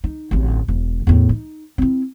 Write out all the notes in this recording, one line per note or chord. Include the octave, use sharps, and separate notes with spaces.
D#4
D1 A1
E1
E2 A2
D#4
C4 E4